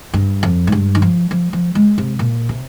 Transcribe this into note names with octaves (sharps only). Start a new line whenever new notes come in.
G2
F2
G#2
G2
D#3
F3
F3
F3
G#3
C3
A#2
C3